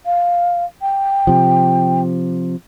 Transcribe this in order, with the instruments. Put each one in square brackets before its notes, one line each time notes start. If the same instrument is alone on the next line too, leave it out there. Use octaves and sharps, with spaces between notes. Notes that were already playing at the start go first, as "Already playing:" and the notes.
[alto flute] F5
G5
[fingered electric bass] C3 F3